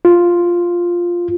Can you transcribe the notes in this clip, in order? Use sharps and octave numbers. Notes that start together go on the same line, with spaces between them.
F4